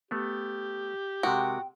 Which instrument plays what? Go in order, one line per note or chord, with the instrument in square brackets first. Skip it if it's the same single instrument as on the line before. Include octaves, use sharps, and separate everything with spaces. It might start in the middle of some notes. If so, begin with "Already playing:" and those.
[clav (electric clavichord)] A3 B3 [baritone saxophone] G4
[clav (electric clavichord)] C3 G#3 A#4 [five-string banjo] F#4 [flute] G5